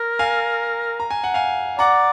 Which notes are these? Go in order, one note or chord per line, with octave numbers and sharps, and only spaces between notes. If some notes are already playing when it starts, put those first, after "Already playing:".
Already playing: A#4
F5 G#5
A#5
G#5
F#5
F5 G#5
D5 F#5 A#5